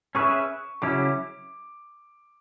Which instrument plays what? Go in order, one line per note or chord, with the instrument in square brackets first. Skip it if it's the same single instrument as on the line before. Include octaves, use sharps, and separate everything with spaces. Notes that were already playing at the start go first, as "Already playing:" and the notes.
[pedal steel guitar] C#4 G#4 B4 E5 [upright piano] C#6
[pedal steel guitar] C#3 F#3 C#4 E4 [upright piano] D6